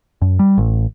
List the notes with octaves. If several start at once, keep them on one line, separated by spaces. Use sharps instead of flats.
F#2
G3
A1